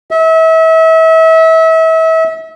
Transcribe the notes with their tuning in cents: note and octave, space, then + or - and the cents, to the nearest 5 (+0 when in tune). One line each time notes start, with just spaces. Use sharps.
E5 -35